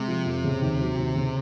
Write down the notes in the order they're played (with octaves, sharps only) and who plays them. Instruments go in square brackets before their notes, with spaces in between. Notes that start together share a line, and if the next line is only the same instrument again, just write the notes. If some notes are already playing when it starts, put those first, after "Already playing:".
Already playing: [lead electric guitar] C3 [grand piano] G#3
[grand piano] F3
F2
C#3
D#2
F#3
D#2
C#3